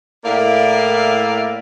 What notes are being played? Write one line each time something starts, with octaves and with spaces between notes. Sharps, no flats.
A2 A#3 E4 A#4 D5 F5